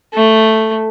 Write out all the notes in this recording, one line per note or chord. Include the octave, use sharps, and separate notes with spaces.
A3